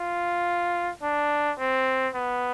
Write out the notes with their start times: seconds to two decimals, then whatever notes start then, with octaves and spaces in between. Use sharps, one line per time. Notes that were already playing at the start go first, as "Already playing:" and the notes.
Already playing: F4
1.02 D4
1.59 C4
2.14 B3